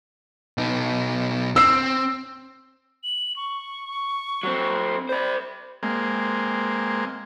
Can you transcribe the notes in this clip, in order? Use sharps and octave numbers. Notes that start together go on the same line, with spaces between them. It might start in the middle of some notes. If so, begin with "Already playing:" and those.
B2 D#4
C4 E6 C7
F#7
C#6
F#3 C4
C5 D5 B5
G#3 A#3 C4